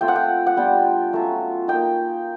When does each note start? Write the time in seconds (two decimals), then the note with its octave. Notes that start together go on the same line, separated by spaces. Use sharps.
0.01 A3 C4 F4 G5
0.08 F#5
0.15 G5
0.47 F#5
0.57 G3 B3 D4 F4 G5
1.13 F#3 A3 C#4 F4
1.68 A#3 D#4 G5